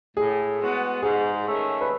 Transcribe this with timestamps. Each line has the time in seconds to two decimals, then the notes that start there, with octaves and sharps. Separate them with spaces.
0.17 A2 G#4
0.61 G#3 B3 F#4
1.03 G#2 G#4
1.46 D#3 A3 C#4
1.81 B4